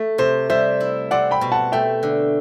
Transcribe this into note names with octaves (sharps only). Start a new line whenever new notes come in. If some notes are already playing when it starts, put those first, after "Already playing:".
Already playing: A3
C3 C5
G3 C5 E5
E4
C4 D5 F#5
G5 B5
B2
F#5 A5
A3 E5 G5
D3